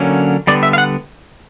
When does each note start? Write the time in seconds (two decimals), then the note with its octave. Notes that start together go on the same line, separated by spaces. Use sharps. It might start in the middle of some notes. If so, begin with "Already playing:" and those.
Already playing: D3 F#3 A#3 C#4
0.47 D3 G3 B3 D5
0.63 E5
0.73 F5
0.78 F#5